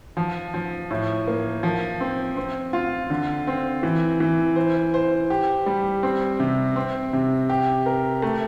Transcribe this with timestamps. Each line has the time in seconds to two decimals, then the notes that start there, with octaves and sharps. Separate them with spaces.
0.17 F3
0.54 F3
0.91 A2
1.27 A#3
1.63 F3
2.00 C4
2.37 C4
2.73 F4
3.10 D3
3.47 C4
3.83 E3
4.20 E3
4.56 C5
4.94 C5
5.30 G4
5.66 G3
6.03 C4
6.40 C3
6.76 C4
7.13 C3
7.49 G4
7.86 A#4
8.22 A3